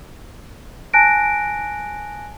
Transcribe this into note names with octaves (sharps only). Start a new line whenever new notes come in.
G#5 A5 F#6 A#6 D7